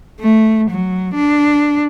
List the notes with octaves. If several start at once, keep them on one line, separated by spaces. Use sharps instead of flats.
A3
F#3
D4